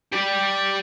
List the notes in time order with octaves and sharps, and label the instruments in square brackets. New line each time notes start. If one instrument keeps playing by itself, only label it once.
[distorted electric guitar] G4 D5